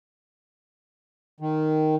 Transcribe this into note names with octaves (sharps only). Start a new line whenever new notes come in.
D#3